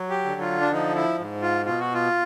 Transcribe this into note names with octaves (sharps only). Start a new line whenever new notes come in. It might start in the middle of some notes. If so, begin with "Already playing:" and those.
Already playing: F#3
G4
D3
F4
D4
F3 D#4
E4
G#2
F4
B2 F4
F#4
F4